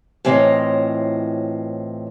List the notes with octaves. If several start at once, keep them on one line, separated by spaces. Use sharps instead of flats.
A2 E3 C4 F4 C#5 D#5